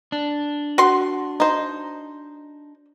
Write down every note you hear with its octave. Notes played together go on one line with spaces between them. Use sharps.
D4
F#4 C6
D#4 C5